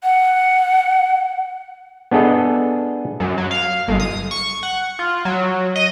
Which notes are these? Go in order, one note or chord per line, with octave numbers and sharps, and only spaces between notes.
F#5
B3 D4 G#4 A4 D#5
F#2
F#3
F5
G1
D#6
C#6
F#5
F4
F#3
D#5